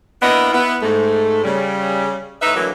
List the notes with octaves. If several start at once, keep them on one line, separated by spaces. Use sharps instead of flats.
A#3 B3 D4 E4 D#5 E5
B3 E4
G#2 A3
C#3 G3
A2 D#4 B4 E5
D3 E3 F#3 A#3